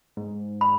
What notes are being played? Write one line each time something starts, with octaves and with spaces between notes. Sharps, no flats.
G#2
B5